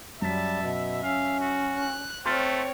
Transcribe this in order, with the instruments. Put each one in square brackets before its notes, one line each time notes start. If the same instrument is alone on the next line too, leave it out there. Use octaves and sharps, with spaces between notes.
[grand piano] F#2 B6 [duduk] G3 [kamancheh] E5 [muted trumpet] A5
[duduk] B2
[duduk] C#4 [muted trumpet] F5
[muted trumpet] F#4
[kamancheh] F#6
[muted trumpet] A3 [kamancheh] C4 C#5 [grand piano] C6 F6 A6